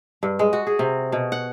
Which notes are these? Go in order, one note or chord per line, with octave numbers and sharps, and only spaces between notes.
G2
G#3
F#4
G#4
C3
B2
F#5